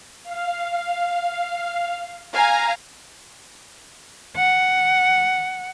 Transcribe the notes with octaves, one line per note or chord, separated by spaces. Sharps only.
F5
F5 G#5 A#5
F#5